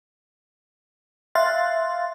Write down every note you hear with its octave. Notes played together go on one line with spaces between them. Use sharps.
E5 F5 C6 F#6 A6